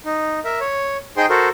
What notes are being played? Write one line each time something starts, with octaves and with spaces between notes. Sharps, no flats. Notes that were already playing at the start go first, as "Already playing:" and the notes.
D#4
A#4 E5
C#5
D#4 G#4 C5 G5 C6
F#4 A4 A#4 C5